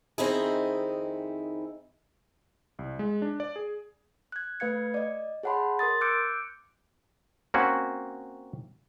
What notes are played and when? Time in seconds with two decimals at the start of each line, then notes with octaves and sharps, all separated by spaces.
0.18 F2 D#3 C4 D#4 E4 G#4
2.79 C2
2.99 G#3
3.22 D4
3.40 D5
3.56 G#4
4.32 F#6 G#6
4.60 A3 B4 F5 G#6 C#7
4.94 D5 D#5
5.43 G#4 C#5 F#5 A5 B5 C6
5.79 A#4 C6 D#6 A6
6.01 D6 E6 F#6 G6 C#7 D7
7.54 A#3 C4 C#4 F#4